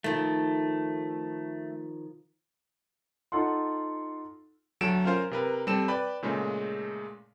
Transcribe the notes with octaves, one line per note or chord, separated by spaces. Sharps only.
D#3 F3 A3
D#4 F4 A4 F#5 C6
D2 F#3 A4 D7 E7
C#4 F4 A#4 C5 F5
C3 A#4 B4
G3 C4 A4 E7
B4 D5 G5 B5
A#2 C#3 G#3 A3